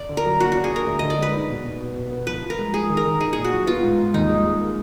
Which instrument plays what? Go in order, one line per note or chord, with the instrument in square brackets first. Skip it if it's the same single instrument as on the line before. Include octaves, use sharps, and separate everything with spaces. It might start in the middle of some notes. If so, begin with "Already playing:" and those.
Already playing: [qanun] D5
[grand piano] D3
[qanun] A#4
[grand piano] F#3
[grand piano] A#3 [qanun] F#4
[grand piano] D4 [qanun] F#4
[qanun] G#4
[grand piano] D4 [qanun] A#4
[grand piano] D2
[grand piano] D3 [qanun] D#5
[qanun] D5
[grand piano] G#3 [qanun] B4
[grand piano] D#4
B2
B2
B2
B2
B3
[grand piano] F3 [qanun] B4
[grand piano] F3
[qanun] A#4
[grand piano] G#3
[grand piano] G#3 [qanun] G#4
[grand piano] D#3
[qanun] A#4
[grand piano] D#3
[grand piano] D#4 [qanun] G#4
[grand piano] A#2 [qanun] G#4
[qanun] F#4
[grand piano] F#3
[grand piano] B3 [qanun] F4
[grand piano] G#2
G#2
[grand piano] D#2 [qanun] D#4
[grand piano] G#3
G#3
A#3